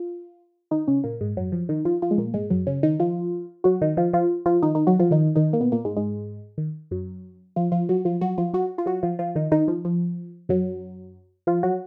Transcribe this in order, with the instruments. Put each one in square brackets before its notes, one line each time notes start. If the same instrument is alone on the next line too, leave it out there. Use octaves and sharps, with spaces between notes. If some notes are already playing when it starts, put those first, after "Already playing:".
Already playing: [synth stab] F4
D#3 D#4
C#3 C#4
A#2 A#3
G#2 G#3
F#2 F#3
F3
D#3 D#4
F3 F4
F3 F4
G#3
A#2 A#3
G#2 G#3
F#2 F#3
C#3 C#4
D#3 D#4
F3 F4
F#3 F#4
D#3 D#4
F3 F4
F3 F4
F3 F4
D#3 D#4
D#3 D#4
F#3 F#4
F3 F4
D#3 D#4
D#3 D#4
A#3
B2 B3
A#2 A#3
G#2 G#3
G#2 G#3
D#3
F#2 F#3
F3 F4
F3 F4
F#3 F#4
F3 F4
F#3 F#4
F3 F4
F#3 F#4
F4
F#3 F#4
F3 F4
F3 F4
D#3 D#4
D#3 D#4
F3
F3
F#2 F#3
F3 F4
F#3 F#4